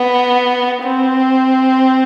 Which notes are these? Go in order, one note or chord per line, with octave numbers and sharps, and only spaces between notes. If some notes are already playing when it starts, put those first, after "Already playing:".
Already playing: B3
C4